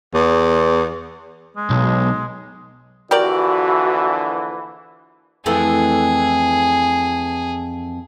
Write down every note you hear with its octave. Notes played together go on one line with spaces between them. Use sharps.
E2
G#3
B1
A#1 D3 E3 F#4 G4 A#4 D5
F2 E3 A3 G#4